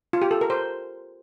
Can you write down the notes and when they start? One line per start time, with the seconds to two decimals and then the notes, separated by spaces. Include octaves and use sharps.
0.13 F4
0.22 G4
0.31 A4
0.41 A#4
0.50 C5